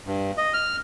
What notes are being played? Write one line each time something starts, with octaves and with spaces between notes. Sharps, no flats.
G2
D#5
F6